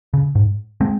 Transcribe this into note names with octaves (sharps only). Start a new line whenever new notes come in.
C#3
G#2
G#3 C4